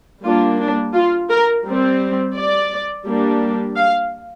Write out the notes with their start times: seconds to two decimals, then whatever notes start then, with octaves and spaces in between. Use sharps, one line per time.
0.24 G3 A#3 D4 F4
0.60 D4
0.94 F4
1.30 A#4
1.66 G3 C4
2.36 D5
3.06 G3 A#3 D4
3.76 F5